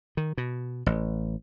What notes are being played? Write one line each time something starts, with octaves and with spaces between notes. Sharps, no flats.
D#3
B2
A1